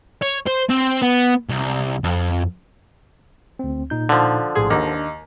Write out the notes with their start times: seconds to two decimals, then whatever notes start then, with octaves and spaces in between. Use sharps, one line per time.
0.22 C#5
0.46 C5
0.69 C4
1.02 B3
1.50 C2
2.04 F2
3.59 D2 C4
3.90 A#2 D#4 G6
4.09 D3 F3
4.55 A#1 A2 G#4 C6
4.70 D#2 D4 A#6